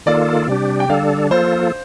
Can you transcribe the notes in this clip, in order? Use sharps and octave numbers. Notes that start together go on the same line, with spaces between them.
D#3 A#3 F4 A4 D5
C3 G3 D4 G4
G5
D3 G3 D4 A4 F5
F3 A#3 F4 A4 C5